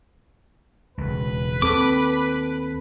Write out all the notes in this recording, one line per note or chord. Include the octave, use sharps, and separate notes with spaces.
E1 C#2 B4
D#2 C4 A4 D6